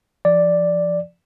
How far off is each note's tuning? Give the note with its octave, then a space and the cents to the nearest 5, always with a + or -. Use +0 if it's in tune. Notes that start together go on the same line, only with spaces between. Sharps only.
F3 -25 D5 +0